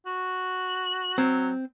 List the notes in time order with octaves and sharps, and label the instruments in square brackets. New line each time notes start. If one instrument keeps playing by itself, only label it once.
[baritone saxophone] F#4
[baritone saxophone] F#3 [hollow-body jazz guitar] C4